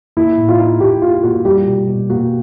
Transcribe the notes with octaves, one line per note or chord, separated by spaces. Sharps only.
A#3 E4
A2
F4
D#4
A#2 G4
A#2 F4
A#2 F#4
G3 G4
B2
B2
A#3 F#4